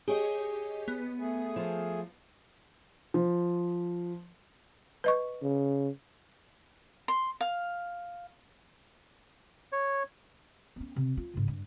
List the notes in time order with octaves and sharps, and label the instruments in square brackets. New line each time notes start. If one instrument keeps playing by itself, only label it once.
[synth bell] G4 C#5 D#5 [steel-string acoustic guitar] G#4
[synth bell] B3
[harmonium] A3 G#4
[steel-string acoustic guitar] F3
[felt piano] F3
[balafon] B4 D#5 C#6
[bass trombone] C#3
[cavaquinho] C6
F5
[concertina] C#5
[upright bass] B3 C#4
C3
F4
G#2 C#3
G2